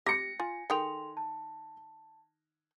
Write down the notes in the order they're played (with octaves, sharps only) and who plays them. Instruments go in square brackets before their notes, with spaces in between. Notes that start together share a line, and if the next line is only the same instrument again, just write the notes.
[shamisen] G4 [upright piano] A#6 C#7
[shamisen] F4 [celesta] G#5
[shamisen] D#3 G#4 G5 [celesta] A4 C6 F7
[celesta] A5